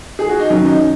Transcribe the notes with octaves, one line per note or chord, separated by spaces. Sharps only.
G#4
F#4
D#4
F#2 D#3 F#3 C#4
D#4